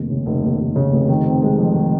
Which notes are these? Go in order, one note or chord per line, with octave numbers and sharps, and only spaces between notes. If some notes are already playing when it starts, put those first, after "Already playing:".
Already playing: F1 D#2
C#3
F1
D#2
F1
C#3
F1
D#3
C4
G#3
F2
D#3